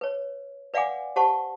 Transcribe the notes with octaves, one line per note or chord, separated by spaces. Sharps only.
B4 C#5
B4 D5 F5 F#5 G#5 D6
G4 C5 F#5 A5 C#6